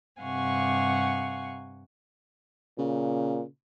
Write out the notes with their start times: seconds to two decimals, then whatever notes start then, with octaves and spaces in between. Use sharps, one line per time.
0.20 G2 C3 F5 F#5 G#5 C#6
2.78 A#2 C#3